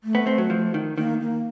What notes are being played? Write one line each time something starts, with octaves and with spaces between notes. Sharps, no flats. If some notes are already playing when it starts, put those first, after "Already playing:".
A3
B3
C4
F#3
F3
D#3
D#3 A#3
A#3